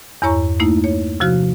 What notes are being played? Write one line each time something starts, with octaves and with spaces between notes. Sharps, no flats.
E2 G2 E4 C#5 A#5 C#6
A3 A#3 D#4 E4
C#5
C3 F3 F#4 F6